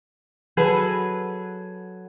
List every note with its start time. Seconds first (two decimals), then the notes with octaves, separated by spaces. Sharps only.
0.57 F#3 G#4 A4 B4